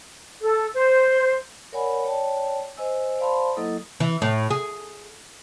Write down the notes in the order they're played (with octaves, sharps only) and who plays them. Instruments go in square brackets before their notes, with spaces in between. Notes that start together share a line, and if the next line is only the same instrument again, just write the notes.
[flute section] A4
C5
[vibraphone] A#4 C#5 D5 F#5 G#5 B5
C#5 D5 G5 A5
C5 D#5 G#5 E6
C5 D5 F5 A5 B5 C6
F#3 A#3 E4 A4 D#5 D#6
[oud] E3
A2
G#4